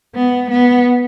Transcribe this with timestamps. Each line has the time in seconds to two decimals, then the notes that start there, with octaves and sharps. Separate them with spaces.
0.15 B3
0.50 B3